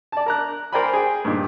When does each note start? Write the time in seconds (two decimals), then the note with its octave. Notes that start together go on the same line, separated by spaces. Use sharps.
0.12 D5 A5
0.26 A#4 A#5 F#6
0.72 A#4 C5 D5 G5 G#5 B5
0.93 G#4 G5
1.25 G2 A#2 D#3